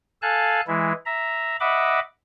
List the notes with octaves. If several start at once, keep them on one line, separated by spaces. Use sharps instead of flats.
A4 F5 G#5 A5 F#6
E3 G#3 E4
E5 A#5
D#5 E5 F#5 B5 D6